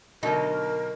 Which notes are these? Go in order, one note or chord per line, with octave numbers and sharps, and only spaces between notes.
B2 D3 F#3 D#4 A#4